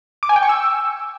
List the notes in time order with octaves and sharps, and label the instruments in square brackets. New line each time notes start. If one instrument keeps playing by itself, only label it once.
[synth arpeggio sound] D6
G#5
G5
C#6
E6